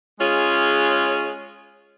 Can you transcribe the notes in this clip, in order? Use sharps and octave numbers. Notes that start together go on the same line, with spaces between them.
G#3 C#4 F4 G#4